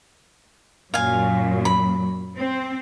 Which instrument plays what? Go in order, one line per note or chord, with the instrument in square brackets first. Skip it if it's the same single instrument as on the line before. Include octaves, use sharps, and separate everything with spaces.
[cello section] F#2 A#2 F#3 [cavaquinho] F5 G#5
[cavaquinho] B5
[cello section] C4